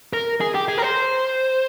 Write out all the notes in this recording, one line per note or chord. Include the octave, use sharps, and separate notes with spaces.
A#4
G#4
G4
G#4
A#4
C5